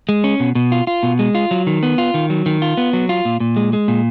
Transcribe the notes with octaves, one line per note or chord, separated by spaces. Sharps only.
G#3
C#4
B2
B2
F4
F4
B2
G#3
F4
F#3
D#3
B3
F4
D#3
F#3
D#3
F4
B3
F#3
F4
A#2
A#2
G#3
G#3
A#2